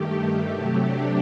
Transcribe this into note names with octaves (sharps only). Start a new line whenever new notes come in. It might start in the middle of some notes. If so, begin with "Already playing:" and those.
Already playing: G2 D#3 A3 G4
C3 F#3 A3
D4